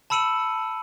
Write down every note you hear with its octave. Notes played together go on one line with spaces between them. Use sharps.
A5 B5 E6 C#7 D#7 F#7